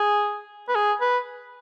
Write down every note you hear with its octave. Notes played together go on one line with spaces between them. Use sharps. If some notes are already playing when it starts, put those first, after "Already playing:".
Already playing: G#4
B4
G#4
B4